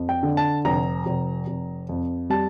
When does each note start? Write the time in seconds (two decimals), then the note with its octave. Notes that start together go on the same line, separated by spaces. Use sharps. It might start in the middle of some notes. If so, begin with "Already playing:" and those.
Already playing: F2
0.09 G5
0.23 D3
0.37 A5
0.65 F1 A#5
1.06 F1
1.47 F1
1.89 F2
2.30 G3 A5